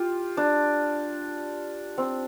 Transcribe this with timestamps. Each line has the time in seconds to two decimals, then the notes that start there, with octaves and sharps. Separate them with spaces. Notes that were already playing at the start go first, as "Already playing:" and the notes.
Already playing: F4 G4
0.37 D4
1.98 C4